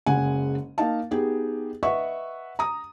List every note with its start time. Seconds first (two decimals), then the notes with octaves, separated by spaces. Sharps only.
0.06 F#1 C#3 G#3 F#5 G#5
0.78 A#3 D#4 D#5 F5 A5
1.11 B3 D#4 G4 G#4
1.83 B4 D#5 E5 F#5 C#6
2.59 A#5 D#6